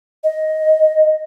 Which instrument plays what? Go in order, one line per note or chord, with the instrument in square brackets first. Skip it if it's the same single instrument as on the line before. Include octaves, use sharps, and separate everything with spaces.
[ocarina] D#5